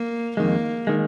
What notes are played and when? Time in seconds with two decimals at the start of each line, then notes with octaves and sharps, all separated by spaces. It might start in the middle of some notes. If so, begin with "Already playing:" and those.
Already playing: A#3
0.37 F2 D#3 G#3 A#3
0.87 D#3 G#3